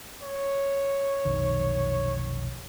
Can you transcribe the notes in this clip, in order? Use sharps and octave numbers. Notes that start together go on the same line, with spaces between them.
C#5
F1 B1 D#3